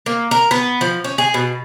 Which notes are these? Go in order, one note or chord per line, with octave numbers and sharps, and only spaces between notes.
A#3
A#4
B3
F3
C#4
G#4
B2